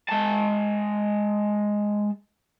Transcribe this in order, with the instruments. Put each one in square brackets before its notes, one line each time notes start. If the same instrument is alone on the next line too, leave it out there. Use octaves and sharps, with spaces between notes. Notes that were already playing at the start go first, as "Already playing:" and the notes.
[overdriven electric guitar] G#3 A5